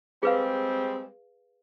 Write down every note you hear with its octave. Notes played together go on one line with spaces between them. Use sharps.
G3 G#3 C4 G#4 B4 F5